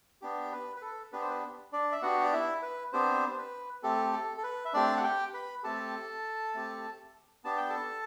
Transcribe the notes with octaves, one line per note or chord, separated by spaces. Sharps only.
B3 D4 G4
B4
B4
A4
B3 D4 G4 B4
C5
B4
D4 D5
E5
B3 D4 F#4 G4 F#5
D5
E4 E5
B4
B3 C4 D4 G4 C5
C5
B4
A3 C4 G4 A4
A4
A4
B4
E5
A3 C4 D4 G4 D5
F#5
G4 G5
B4 B5
A3 C4 G4 A4 A5
A3 C4 G4
B3 D4 G4 A5
G5
A4 A5